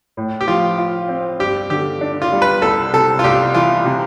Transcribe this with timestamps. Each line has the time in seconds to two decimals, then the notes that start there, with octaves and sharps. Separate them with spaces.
0.17 A2
0.41 G4
0.48 F3 F4
0.78 F4
1.08 C4
1.39 G2 G4
1.70 D3 G4
2.01 D4
2.22 F4
2.32 G3
2.42 B4
2.62 C2 A4
2.93 C3 A4
3.19 F4
3.24 C2 G4
3.54 E3 F4
3.85 C3